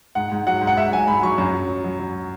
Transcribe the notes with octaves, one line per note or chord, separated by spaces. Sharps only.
G#2 F#5
G#2
F#3 F#5
G#2
F#5
G#2 E5
F#3 G#5
G#2 B5
F#3 C#6
F#2
F#3
F#3
F#3
F#3